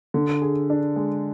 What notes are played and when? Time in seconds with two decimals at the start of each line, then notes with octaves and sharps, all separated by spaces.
0.14 D3
0.42 G#4
0.70 D4
0.96 G#3